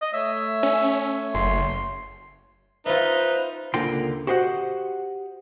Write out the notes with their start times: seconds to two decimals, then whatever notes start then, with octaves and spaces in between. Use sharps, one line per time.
0.02 D#5
0.13 A3 C#5 E5
0.63 C#4
1.34 F#1 C6
2.86 D#4 F4 B4 C5 E5
3.74 C#2 D3 A#3 F4 G5 C6
4.27 F#4 G4 C5 D#5 F#5